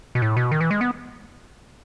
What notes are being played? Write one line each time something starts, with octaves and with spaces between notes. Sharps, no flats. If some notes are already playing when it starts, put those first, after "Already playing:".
B2
A2
B2
D#3
E3
G#3
B3